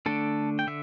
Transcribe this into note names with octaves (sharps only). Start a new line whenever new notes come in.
D3 A3 D4 A4
G5
D3 E5